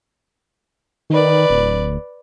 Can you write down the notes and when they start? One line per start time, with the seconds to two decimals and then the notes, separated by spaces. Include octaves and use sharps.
1.10 D#3 B4 D5
1.50 D1